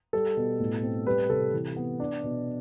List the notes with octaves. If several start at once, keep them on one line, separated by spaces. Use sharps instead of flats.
G3 A4
B2
A2
C4
G3 B4
C3 A4
E3
B3
D4
B2